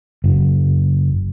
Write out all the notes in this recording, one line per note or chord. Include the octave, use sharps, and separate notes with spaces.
F#1